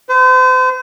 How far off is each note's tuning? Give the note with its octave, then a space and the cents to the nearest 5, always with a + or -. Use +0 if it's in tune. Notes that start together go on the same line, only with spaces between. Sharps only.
C5 -40